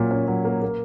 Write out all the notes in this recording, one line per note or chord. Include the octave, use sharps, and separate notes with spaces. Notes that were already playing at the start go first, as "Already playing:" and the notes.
Already playing: A#2 F#3 A#3 C#4
C#4
F#3
A#3
A#3